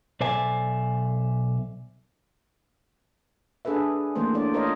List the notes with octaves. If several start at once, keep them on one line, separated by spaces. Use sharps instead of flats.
B1 A4 C5 D5 E5 G#5
D4 G#4 A4 B4 E5
E3 A3 A#3 C4 C5
C#4 D4 D5
F4 A#4 C5 C#5 D#5